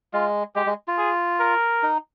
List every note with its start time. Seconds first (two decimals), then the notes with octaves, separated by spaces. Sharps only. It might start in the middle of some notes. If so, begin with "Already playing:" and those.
0.13 G#3 F4
0.56 G#3 G4
0.66 G#3
0.88 F4
0.98 G#4
1.40 A#4
1.83 D#4